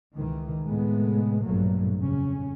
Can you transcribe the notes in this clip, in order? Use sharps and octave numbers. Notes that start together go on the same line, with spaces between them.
C#2 D#3 E3
A2 C3 G#3 A3 B3
A#1 G2 B2 F#3 A3 A#3
F2 C#3 C#4